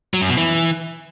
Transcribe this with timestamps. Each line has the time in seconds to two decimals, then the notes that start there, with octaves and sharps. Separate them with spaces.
0.14 F#3
0.22 F#2
0.30 B2
0.37 E3